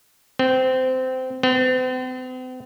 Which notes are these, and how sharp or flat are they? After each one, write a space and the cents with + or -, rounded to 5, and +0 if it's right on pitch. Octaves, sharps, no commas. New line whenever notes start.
C4 -20
C4 -45